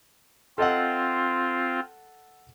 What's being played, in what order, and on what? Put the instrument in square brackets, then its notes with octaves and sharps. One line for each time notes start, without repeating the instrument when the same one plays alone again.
[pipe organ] C4 F4 [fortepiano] A4 D#5 F#5